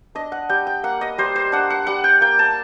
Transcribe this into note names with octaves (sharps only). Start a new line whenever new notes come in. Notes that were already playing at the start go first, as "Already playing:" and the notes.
D4 D#5
F#5
G3 G5
G5
A#3 F#5
D#5
G3 C5
C5
D4 F#5
F#5
G3 F#5
G5
A#3 G5
A5